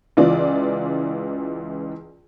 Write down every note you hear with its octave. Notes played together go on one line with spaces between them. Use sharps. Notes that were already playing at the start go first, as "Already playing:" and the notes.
C#2 E3 F4 D5